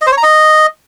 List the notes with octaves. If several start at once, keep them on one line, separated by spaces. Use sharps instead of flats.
D#5
C5
C#5
A#5
D#5